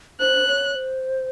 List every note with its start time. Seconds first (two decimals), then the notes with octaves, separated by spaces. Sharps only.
0.20 C5 F#6
0.48 C#5
0.75 C5